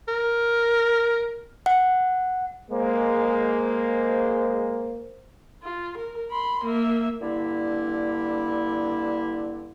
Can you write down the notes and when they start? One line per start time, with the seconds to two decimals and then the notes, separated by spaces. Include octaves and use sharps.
0.08 A#4
1.66 F#5
2.71 G#3 A#3 C5
5.63 F4
5.98 A#4
6.31 B5 C6
6.65 A#3 E5
7.21 G2 D3 A#3 E4